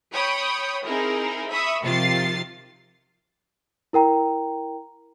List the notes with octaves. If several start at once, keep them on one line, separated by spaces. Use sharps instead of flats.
C#5 G5 B5 C#6 D#6
C4 D#4 E4 G#4 A#4
E5 B5 C#6 D#6
C3 D#3 F3 F4 A6 C7
E4 A#4 G5 A#5